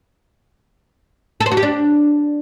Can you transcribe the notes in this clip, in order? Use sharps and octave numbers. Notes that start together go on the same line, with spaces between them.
A4
C5
F#4
G4
D4